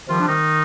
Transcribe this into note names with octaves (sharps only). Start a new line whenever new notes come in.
C3 D#3 F3 G3 F4
D4
D#3 D#4